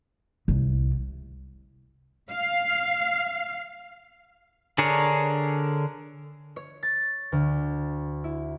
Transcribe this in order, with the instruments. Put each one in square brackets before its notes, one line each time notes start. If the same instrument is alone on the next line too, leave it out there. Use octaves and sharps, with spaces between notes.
[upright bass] C2
[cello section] F5
[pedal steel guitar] D3 D4 G#4 A#4 C#5
[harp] C#5
A6
D2
E4